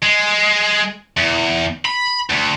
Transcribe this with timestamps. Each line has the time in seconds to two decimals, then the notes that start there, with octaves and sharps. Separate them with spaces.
0.03 G#3
1.17 E2
1.85 B5
2.30 D2